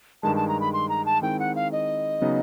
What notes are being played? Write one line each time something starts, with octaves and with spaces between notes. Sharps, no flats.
G2 D#3 G#3 A5
A5
A#5
B5
C6
A#5
A5
D#3 G#3 C4 E4 G5
F#5
F5
D#5
C#3 F#3 B3 D#4